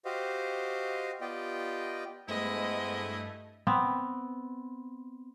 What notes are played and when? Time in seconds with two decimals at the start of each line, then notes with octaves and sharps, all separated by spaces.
0.05 F#4 G4 C5 D#5 F5
1.21 B3 F4 G4 D5 D#5 G5
2.28 G2 G#3 A3 B3 E4 C5 D#5
3.67 B3 C4